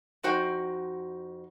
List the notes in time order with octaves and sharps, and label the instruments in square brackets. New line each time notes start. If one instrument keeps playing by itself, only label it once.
[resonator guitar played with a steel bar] F2 D#4 F#4 C5 G5